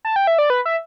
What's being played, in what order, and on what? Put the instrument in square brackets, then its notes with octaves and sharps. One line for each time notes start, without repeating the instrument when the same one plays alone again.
[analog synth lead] A5
G5
E5
D5
B4
E5